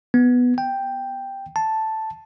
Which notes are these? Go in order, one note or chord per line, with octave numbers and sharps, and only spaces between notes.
B3
G5
A5